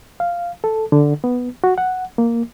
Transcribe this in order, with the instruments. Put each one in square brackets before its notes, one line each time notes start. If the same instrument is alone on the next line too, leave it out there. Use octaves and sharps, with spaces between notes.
[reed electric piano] F5
A4
D3
B3
F#4
F#5
A#3